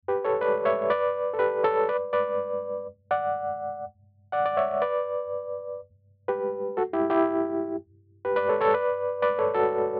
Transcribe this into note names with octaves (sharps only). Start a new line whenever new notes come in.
G4 B4
A4 C#5
B4 D5
C#5 E5
B4 D5
A4
G4 B4
A4 C#5
B4 D5
B4 D5
D5 F#5
D5 F#5
D5
C#5 E5
B4 D5
G4 B4
F#4 A4
E4 G4
E4 G4
G4 B4
B4 D5
A4 C#5
A4 C#5
B4 D5
B4 D5
A4 C#5
F#4 A4